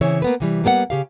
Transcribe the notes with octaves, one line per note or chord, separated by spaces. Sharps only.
C#3 E3 C4 E4 C#5
A#3 B3 B4
C3 E3 G3
G3 A#3 B3 A4 F#5
C#3 G4 F5